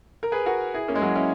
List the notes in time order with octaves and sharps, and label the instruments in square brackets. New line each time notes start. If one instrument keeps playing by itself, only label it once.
[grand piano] A#4
G#4 B4
F#4 A#4
E4 G#4
A#3 C#4
G#3
F#3 A#3
C#4 E4